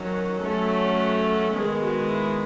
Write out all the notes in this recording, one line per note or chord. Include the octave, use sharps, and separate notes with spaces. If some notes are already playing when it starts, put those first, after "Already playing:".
Already playing: D#3 F#3 C#4
F#3 A3 C#4 A4
D#3 G#3 B3 G#4
F#4
E4